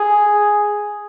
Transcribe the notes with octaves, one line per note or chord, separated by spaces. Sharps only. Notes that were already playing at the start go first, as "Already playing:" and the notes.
Already playing: G#4